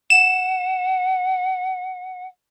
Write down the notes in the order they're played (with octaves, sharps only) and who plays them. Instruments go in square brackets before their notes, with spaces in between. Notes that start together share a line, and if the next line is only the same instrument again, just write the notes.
[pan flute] F#5 [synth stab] E7